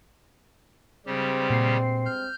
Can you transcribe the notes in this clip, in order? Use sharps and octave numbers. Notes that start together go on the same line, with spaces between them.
G2 C#3 G3 G#3 C4 G4
A#2 C7
F6 G6